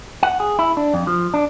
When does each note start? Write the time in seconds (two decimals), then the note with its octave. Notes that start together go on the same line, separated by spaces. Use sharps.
0.23 F#5
0.40 G#4
0.59 E4
0.77 D4
0.94 F2
1.07 F3
1.34 D4